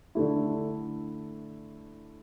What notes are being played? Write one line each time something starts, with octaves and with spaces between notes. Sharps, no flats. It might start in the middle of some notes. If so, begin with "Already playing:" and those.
D3 A3 E4